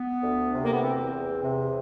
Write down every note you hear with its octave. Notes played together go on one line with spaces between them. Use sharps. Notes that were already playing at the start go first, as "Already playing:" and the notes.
Already playing: B3
D2
C3
A#3
B3
E2 C4
E2
C3